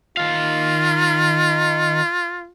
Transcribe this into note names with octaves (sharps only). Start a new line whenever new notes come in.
D#3 F4 F5